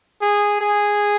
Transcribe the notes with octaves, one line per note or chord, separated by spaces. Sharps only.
G#4
G#4